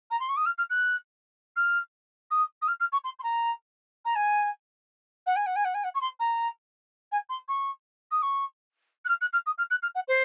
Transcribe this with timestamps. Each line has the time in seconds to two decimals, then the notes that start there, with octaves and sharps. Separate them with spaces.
0.10 A#5
0.20 C6
0.28 C#6
0.36 D#6
0.45 F6
0.58 F6
0.69 F#6
1.56 F6
2.30 D#6
2.61 D#6
2.67 F6
2.80 F6
2.92 C#6
3.04 C6
3.19 C6
3.23 A#5
4.04 A#5
4.15 G#5
5.26 F#5
5.36 G#5
5.46 F#5
5.55 G#5
5.64 F#5
5.74 G#5
5.84 F#5
5.94 C#6
6.01 C6
6.19 A#5
7.11 G#5
7.29 C6
7.48 C#6
8.11 D#6
8.22 C#6
9.05 F#6
9.08 F6
9.21 F#6
9.32 F6
9.46 D#6
9.57 F6
9.70 F#6
9.82 F6
9.95 F#5
10.08 C5